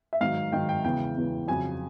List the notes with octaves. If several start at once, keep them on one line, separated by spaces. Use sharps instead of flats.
E5
G#2 D#3 F#3 F5
G#2 D#3 F#3 G5
G5
E2 C#3 E3 G5
E2 C#3 E3
F2 C#3 F#3 G#5